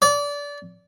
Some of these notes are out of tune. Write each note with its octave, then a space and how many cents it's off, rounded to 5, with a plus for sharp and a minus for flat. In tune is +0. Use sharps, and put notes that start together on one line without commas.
D5 -25